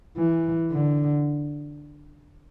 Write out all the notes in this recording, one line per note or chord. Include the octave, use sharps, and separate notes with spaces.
E3
D3